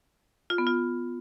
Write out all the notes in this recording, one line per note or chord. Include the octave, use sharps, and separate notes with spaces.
F4
B3
F4